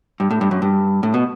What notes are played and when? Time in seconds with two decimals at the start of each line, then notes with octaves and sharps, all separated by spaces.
0.20 G2
0.31 A2
0.41 G2
0.51 F#2
0.62 G2
1.03 A2
1.14 B2